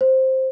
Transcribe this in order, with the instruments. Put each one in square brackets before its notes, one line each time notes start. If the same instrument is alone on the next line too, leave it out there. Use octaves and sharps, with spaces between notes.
[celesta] C5